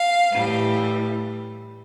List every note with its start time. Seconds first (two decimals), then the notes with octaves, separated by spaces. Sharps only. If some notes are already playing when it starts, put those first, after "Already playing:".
Already playing: F5
0.32 A2 E3 G3